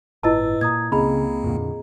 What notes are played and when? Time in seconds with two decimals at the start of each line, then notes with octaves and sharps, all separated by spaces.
0.23 G1 A2 E4 B4 D#5 A5 E6 A6
0.61 A#2 A#5 D#6 G#6
0.92 C#2 C#3 A#3 C4 G#4 D#5 A#5 B5
1.44 F2 A#2 D3